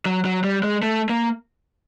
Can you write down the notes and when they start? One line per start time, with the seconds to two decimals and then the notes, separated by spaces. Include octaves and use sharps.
0.06 F#3
0.25 F#3
0.44 G3
0.63 G#3
0.83 A3
1.09 A#3